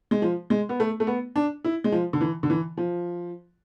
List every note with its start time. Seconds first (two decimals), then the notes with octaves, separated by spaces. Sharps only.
0.11 G#3
0.22 F3
0.50 G#3
0.69 B3
0.80 A3
1.00 A3
1.07 B3
1.36 D4
1.64 E4
1.84 G#3
1.92 F3
2.13 D3
2.21 E3
2.43 D3
2.50 E3
2.77 F3